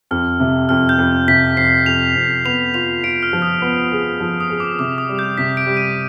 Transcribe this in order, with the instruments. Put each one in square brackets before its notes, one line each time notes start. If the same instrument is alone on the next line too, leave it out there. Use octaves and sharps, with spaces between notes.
[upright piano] F2 [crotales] F6
[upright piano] C3
[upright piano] F2 [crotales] F6
[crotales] G6
[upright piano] F2
[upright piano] C3 [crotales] B6
[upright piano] F2 [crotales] C7
[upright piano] F2 [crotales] F7
[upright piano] F2
[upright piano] B3 [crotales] F7
[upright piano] F4 [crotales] F7
[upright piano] F4 [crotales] D7
[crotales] F6
[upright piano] F3
[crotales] D#6
[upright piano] B3
G#4
F3
[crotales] D#6
[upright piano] G#4
[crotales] D6
[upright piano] C3 [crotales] D6
[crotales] D#6
[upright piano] G3
[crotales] G6
[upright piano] C3 [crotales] B6
[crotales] D7
[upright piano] G3
[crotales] D#7